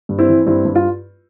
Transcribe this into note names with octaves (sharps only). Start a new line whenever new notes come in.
G2
C4 E4
E3
G2 C4 E4
G2
F4